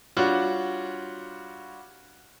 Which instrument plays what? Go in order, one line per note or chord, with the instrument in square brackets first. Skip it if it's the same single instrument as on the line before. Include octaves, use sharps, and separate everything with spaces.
[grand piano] G3 D4 F4 F#4 C#5